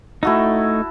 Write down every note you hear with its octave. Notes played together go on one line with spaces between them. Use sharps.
A3 D#4 E4 F#4 A4